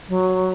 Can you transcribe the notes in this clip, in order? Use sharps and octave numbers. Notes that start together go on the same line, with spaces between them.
F#3